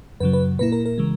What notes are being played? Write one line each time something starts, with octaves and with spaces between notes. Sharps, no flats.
F#2 C#3 F#3 B4
B4
A#2 A#3 E4 B4
A#4
A#4
C#3 E3 G#3